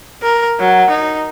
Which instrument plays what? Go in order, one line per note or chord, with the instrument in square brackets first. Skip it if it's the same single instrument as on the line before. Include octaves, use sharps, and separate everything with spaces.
[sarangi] A#4
F#3
D#4